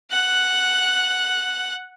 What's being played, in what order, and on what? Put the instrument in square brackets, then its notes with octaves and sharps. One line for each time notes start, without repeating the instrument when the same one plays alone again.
[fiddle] F#5 F#6